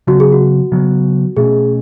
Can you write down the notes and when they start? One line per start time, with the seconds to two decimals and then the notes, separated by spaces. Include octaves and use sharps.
0.07 C#3 F#3 B3 F#4
0.20 G#4
0.32 F#4
0.72 C#3 F#3 B3
1.37 B2 A3 C#4 G#4